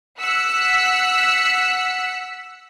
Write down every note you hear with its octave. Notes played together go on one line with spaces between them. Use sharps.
F#5 E6 F#6 B6 C#7